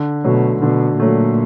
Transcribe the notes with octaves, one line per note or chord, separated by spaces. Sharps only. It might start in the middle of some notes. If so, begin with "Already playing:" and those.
Already playing: D3
B2 F#3 A3
B2 D3
A#2 F#3 A3